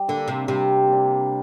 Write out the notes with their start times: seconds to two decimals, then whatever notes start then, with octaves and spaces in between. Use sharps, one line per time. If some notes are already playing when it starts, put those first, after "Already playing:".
Already playing: G3
0.08 D3 A#3 D4
0.28 C3
0.48 C3 G3
0.87 A#3
0.92 D4